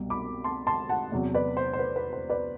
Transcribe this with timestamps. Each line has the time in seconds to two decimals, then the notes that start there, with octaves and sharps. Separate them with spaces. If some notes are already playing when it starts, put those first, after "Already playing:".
Already playing: C2 B2 G3
0.10 B5 D6
0.44 A5 C6
0.67 A5 C6
0.89 F#5 A5
1.12 E2 C3 F#3
1.34 B4 D5
1.57 C5
1.73 C5
1.79 B4
1.96 B4
2.13 C5
2.30 B4 D5